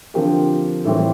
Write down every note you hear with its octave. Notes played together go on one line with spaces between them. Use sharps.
D3 F3 C4 G4 A#4
A2 E3 G3 C4